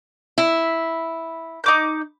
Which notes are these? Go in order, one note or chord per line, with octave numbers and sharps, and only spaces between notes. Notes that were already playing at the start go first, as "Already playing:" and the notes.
E4
D#4 D6 G6